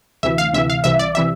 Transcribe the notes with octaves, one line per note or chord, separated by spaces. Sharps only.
D2 C3 E3 E5
F5
D2 C3 E3 E5
F5
C2 C3 E3 E5
D5
C3 E3 E5